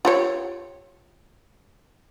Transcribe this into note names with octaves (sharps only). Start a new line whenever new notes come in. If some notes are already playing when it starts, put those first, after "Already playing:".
F4 G4 C#5